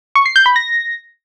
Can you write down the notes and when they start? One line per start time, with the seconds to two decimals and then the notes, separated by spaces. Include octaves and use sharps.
0.15 C#6
0.26 C7
0.36 G6
0.46 B5
0.56 A#6